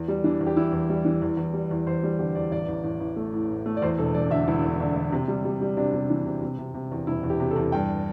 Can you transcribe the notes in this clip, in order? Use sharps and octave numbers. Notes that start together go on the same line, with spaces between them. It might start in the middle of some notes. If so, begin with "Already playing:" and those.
Already playing: E2
G3
E3 D4
E2
G4
E3 E4
E2
G3
E3
E2
E2
G3
E2
E2 C5
G3
D3 G4
E2 D5
A1 D5
A1
A1
A1
A3
A2
A2
A3
D5
E2 C5
E1 A4
E1 D5
D3 E5
E1 E4
E2
D3
D3
C3
G3
G3
G3
C3 D4
C3
E3
C3
C3
C3
C3
E2
E1 E4
E2
G4
C3
A4
E2
G2 G5